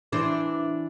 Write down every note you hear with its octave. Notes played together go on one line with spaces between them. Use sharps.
E3 D4 C5